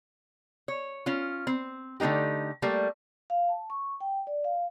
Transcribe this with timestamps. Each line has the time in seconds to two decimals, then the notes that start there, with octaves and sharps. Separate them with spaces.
0.68 C#5
1.06 C#4 F4
1.47 C4
2.00 D3 A3 A#3 D#4 G4
2.62 G3 A3 A#3
3.30 F5
3.49 A5
3.70 C#6
4.01 G5
4.27 D5
4.44 F5